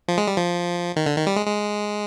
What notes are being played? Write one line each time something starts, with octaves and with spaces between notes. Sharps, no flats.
F3
G#3
G3
F3
D#3
D3
D#3
G3
G#3
G#3